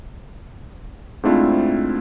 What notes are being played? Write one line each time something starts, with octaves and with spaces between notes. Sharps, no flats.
G#2 A3 C4 D4 E4 F4